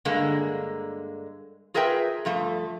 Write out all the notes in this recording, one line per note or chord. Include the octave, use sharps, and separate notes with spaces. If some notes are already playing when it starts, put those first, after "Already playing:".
G2 D3 G#3 A#3
F4 G#4 A#4 B4 E5 G5
G2 F3 A3